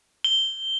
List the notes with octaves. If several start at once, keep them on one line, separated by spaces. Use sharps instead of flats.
G7